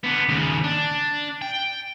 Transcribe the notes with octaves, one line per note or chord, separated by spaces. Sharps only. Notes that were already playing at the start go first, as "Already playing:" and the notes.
D3 B3
D#2 C#3
D4
G5